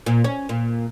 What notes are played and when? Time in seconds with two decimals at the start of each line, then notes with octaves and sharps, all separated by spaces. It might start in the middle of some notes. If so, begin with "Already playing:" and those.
0.06 A#2
0.24 C#4
0.49 A#2